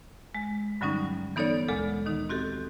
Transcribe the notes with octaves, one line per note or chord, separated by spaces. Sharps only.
G#3
G2 D3 F#3 G3 C#4 D#4
E3 B3 D#4 A4 C#5 D5
D2 A#2 G#3 A4
D#3 D#4
C4 F#4 G4 A4